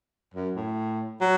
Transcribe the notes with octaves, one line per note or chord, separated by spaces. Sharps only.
F#2
A2
F#3